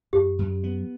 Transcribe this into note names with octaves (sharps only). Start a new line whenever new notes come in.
F#2 G4
F#2
B3